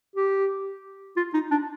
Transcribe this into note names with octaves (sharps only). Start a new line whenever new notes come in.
G4
F4
D#4
D4